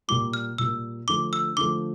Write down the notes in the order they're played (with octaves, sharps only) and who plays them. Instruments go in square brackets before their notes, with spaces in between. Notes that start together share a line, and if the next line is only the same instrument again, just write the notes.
[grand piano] A#2 G3 A#3 [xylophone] D6
[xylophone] F6
[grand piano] A#2 G3 A#3 [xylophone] E6
[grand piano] D3 F3 A3 [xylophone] D6
[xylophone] E6
[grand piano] D3 F3 A3 [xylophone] D6